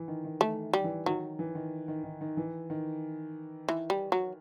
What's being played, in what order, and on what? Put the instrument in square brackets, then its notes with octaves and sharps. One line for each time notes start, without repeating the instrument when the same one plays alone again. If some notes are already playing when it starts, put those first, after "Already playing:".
Already playing: [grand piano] E3
D#3
D#3
[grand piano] D#3 [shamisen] A3
[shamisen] G3
[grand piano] E3
[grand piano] D#3 [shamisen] F#3
[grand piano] E3
D#3
D#3
D#3
D#3
E3
D#3
[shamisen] E3
G3
F#3